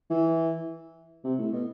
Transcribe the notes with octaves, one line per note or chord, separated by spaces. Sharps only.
E3
C3
A2
B2